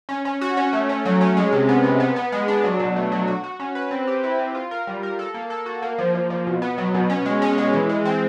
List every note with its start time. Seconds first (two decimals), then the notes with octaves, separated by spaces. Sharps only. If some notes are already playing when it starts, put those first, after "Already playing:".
0.09 C#4
0.25 C#4
0.41 F#4
0.57 C#4
0.73 A3
0.89 C#4
1.05 F#3
1.21 C#4
1.37 G#3
1.52 C3
1.69 B3
1.84 C3
2.00 B3
2.16 B3
2.32 G#3
2.48 D4
2.64 F#3
2.79 B2
2.96 A3
3.12 F#3
3.27 F#4
3.44 F#4
3.60 C#4
3.75 B4
3.91 C4
4.07 G4
4.23 E4
4.39 C4
4.55 F4
4.71 A#4
4.87 G3
5.03 A#4
5.19 A4
5.34 A#3
5.50 A4
5.66 F#4
5.82 A#3
5.98 F3
6.15 F3
6.30 F3
6.47 B2
6.62 B3
6.78 F#3
6.94 B2
7.10 C#4
7.26 G#3
7.42 C#4
7.58 G#3
7.73 E3
7.89 G#3
8.05 C4